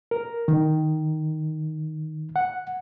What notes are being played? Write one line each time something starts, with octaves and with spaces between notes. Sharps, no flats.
A#4
D#3
F#5